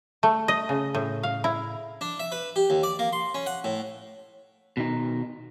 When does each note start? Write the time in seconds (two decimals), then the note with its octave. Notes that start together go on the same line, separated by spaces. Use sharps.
0.23 A3
0.48 D#5
0.69 C#3
0.95 A2
1.23 F5
1.44 E4
2.01 D4
2.19 E5
2.32 B4
2.56 G4
2.70 D#2
2.83 D5
2.99 A#3
3.13 C6
3.34 C#4
3.46 F#5
3.64 A2
4.77 B2 D#3 D#4